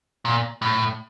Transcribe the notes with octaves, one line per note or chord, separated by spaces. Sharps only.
A#2
A2